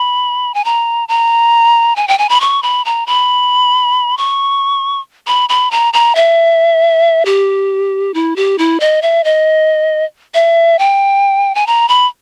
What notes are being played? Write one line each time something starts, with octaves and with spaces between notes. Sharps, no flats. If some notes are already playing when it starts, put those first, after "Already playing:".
Already playing: B5
G#5
A#5
A#5
G#5
G5
G#5
B5
C#6
B5
A#5
B5
C#6
B5
B5
A#5
A#5
E5
G4
E4
G4
E4
D#5
E5
D#5
E5
G5
G#5
A#5
B5